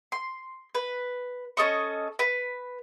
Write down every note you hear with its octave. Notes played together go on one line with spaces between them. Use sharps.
C6
B4
C#4 A4 D#5 C#6
B4